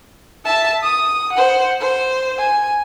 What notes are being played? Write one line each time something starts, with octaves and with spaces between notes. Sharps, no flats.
E5 A5
D#6
C5 F#5
C5
G#5